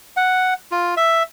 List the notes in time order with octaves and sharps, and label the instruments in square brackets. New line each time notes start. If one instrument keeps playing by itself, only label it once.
[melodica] F#5
F4
E5